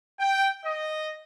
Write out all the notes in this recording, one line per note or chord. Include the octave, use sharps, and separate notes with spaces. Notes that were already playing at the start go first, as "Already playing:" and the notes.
G5
D#5